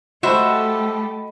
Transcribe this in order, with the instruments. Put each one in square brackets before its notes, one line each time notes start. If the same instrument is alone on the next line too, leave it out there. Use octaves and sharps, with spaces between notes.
[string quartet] A3 G4 A4 [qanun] F#4 [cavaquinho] C5 E5 [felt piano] D#5 B5